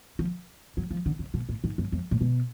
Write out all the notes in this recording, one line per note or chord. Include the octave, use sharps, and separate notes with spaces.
F3
F#3
F3
D3
C#3
B2
A2
G#2
F#2
F2
A2
B2